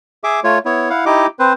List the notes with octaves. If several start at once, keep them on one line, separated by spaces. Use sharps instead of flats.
G#4 E5 D6
A3 F4 C#5
B3 E4 C#5
E4 F5 F#5
D#4 E4 G4 D#5 D6
C4 B4 C5